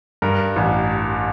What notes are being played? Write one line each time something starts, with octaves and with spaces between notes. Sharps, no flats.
G2 A#4
A1